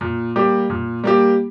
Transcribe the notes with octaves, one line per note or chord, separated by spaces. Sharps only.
A#2
G3 A#3 G4
A#2
G3 A#3 G4